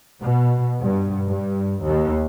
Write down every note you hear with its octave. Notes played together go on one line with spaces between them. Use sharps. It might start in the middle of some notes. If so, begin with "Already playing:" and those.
B2
G2
G2
D#2